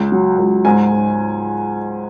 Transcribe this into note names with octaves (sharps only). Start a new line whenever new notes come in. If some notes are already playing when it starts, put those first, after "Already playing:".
Already playing: C#2
F#3
C#2
G#2 G#5
G#2